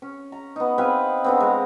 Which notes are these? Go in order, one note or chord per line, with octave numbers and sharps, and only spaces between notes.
C#4
A#5
B3 D#4
C4 B4 F5 G#5
D3 B3 C4
G#3 A#5